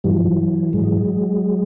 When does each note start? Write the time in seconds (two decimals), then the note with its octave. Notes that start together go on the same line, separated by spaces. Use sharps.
0.04 G2 E3 G3
0.11 F#3
0.18 F3
0.25 E3 F#3
0.73 G#2 E3 F#3 G#3